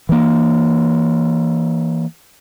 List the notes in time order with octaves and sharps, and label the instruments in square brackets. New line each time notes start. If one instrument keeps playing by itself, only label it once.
[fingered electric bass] E3 A#3